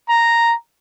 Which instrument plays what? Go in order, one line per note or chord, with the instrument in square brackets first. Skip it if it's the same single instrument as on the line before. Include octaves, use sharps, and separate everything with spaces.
[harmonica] A#5